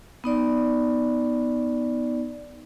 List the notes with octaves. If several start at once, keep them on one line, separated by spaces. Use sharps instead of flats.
B3 D#4 D5